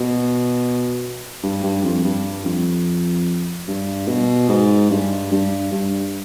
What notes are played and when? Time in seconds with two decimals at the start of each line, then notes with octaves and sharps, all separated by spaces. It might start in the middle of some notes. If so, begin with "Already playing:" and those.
Already playing: B2
1.43 G2
1.63 G2
1.83 F2
2.04 G2
2.45 F2
3.68 G2
4.08 B2
4.49 G#2
4.90 G2
5.31 G2
5.72 G2